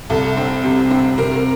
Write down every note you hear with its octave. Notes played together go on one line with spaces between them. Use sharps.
C2 A4
C4
C3
C4
C3 A#4